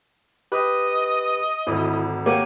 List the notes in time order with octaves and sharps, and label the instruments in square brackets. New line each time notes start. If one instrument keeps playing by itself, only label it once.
[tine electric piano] G4 B4 [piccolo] D#5
[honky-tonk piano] G#1 D2 [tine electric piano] E4
[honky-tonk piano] A#3 [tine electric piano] G4 C#5 F#5 [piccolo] D#7